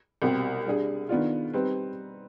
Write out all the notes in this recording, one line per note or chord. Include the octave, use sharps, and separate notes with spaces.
C2 B2 G3 C4 G4
G3 D4 G#4
D#3 B3 D4 F4
G3 C4 D#4 B4